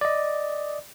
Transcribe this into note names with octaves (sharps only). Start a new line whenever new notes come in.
D5 D#5